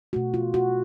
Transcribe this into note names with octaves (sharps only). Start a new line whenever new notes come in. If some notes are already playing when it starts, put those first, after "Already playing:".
B2 A3 F#4
F4
F#4